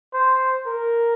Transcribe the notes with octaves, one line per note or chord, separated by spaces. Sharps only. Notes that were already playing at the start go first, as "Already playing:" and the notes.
C5
A#4